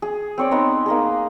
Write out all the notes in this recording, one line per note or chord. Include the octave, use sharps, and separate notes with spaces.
G#4
C4 C#5 D5
B3 D#4 C6
A#3 D#4 G#4